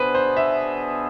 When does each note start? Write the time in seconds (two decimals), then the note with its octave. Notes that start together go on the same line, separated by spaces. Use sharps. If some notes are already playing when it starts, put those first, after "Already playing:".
Already playing: B2 B3 D4 G#4 B4 C5
0.15 C5
0.37 E5